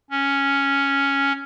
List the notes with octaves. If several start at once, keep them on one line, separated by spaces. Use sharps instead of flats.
C#4